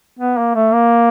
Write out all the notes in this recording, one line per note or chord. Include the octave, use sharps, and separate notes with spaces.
B3
A#3
A3
A#3